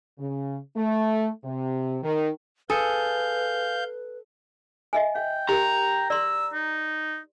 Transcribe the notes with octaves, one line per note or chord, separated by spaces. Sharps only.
C#3
A3
C3
D#3
G#4 A4 B4 F5 G6 C#7
D#5 E5 G#5
F5 G5
G4 A#4 A#5
D5 C6 E6
D#4